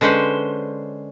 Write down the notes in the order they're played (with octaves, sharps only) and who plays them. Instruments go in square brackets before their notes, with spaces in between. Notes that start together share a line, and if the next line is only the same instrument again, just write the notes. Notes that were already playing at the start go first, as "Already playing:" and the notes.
[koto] D3 G#3 C#4 B4 C5